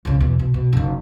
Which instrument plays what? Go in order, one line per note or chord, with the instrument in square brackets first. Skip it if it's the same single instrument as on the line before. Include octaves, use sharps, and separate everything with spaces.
[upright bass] C#2 C#3
E2 B2
B2
B2
F#1 D#3